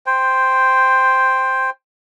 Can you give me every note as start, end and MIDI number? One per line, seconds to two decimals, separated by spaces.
0.06 1.70 72
0.06 1.70 79